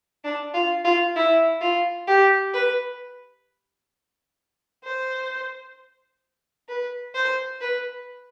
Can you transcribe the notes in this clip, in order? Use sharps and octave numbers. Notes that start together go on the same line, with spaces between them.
D4
F4
F4
E4
F4
G4
B4
C5
B4
C5
B4